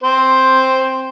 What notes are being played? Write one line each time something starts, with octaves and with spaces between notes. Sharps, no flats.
C4 C5